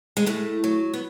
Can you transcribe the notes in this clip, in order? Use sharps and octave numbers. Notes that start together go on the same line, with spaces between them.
G#3
A2 A3
F#3
B3